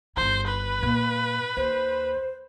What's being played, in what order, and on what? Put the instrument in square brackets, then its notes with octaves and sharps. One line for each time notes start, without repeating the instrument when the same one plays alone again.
[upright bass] G1 D#3 [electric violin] C5
[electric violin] B4
[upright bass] A#2
[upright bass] D#2 [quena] C5